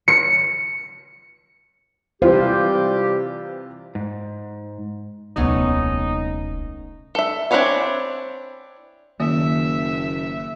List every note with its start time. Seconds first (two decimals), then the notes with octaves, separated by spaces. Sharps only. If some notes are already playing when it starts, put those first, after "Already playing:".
0.08 C#7
2.22 C3 E3 G3 F4 G4 C5
3.95 G#2
5.36 D#1 C2 A3 B3 C#4 D#4
7.15 A4 E5
7.51 C4 D4 E4 C#5 G#5
9.20 F#1 D#3 A#3 E5